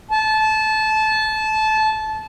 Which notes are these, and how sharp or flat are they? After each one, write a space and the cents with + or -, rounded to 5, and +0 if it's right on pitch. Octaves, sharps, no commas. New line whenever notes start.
A5 -20